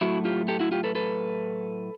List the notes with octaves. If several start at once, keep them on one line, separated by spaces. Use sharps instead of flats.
A2 F#3 A3 E4 F#4
F4 G4
G4 A4
E4 F#4
F4 G4
A4 B4
A4 B4